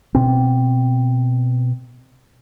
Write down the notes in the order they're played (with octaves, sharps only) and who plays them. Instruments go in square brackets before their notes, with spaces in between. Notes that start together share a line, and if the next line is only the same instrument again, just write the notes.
[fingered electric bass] B2 C4